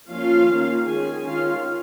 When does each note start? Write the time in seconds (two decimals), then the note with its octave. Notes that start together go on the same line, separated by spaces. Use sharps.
0.11 F3 A#3 C#4 F4 F5
0.50 D#3 A#3 C#4
0.88 D#3 G#3 C#4 G#4 G#5
1.27 D#3 C#4 F4 F5